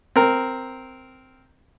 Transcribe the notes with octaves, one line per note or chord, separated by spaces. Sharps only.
C4 A#4